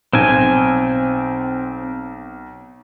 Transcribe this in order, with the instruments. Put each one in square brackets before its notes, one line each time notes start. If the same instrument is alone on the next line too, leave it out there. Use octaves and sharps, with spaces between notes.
[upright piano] B1 [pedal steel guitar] C4 G#5